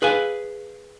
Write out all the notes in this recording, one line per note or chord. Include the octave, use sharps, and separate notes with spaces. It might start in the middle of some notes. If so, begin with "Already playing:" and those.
G#4 B4 F5 G#5